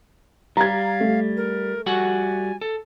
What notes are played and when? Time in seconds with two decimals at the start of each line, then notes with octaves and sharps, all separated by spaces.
0.57 G3 F5 A#5 G#6
1.00 A3
1.37 A#4
1.86 G3 F#4 F#5 G#5
2.61 A4